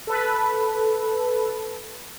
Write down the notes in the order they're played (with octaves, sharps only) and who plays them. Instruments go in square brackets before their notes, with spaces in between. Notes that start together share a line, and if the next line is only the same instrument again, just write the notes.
[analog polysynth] A4 B4